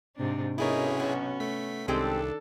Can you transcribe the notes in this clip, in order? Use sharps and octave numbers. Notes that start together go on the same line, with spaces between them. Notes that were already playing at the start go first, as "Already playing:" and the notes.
G#2 C3 D4
B1 B3 C#4 D#4 E4 G#4 A#4 C#5
B3 F#4
A3 B6
C2 D#3 G#3 C4 D4 G4 A4